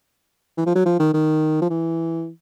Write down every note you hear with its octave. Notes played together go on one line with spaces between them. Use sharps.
E3
F3
F#3
F3
D#3
D#3
F3
E3